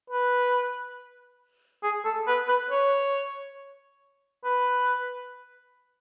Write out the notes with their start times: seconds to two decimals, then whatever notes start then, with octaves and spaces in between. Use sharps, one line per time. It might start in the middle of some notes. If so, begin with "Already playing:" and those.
0.10 B4
1.83 G#4
2.05 A4
2.27 B4
2.48 B4
2.70 C#5
4.44 B4